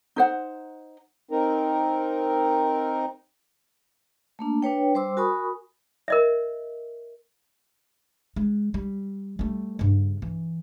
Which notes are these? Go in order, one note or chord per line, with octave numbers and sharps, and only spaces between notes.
D#4 C5 F#5
C4 D#4 A#4
A3 A#3 D4
D4 B4 C#5 G5
G3 C5 C6 D6 E6
F#4 A#4 G#5 B5 C#6 D#6
A#4 D#5 E5
G#3
G3
G3 A3
G2 C#3
E3